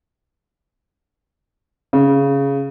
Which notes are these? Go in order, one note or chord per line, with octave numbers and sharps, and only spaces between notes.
C#3